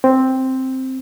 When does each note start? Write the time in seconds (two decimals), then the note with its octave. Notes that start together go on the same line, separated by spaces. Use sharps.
0.04 C4